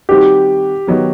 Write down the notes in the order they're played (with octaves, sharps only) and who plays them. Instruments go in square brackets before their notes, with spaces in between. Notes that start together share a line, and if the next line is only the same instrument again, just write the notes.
[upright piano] D#3 G3 C4 D#4 F#4 [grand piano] G4
[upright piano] D#3 F#3 B3 D#4